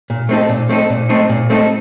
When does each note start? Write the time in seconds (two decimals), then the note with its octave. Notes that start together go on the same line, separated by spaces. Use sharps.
0.10 A#2
0.29 A3 C4 D#4 A4
0.49 A#2
0.69 A3 C4 D#4 A4
0.90 A#2
1.09 A3 C4 D#4 A4
1.29 A#2
1.50 A3 C4 D#4 A4